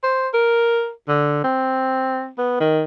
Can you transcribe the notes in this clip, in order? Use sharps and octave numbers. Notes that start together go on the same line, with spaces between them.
C5
A#4
D3
C4
B3
D#3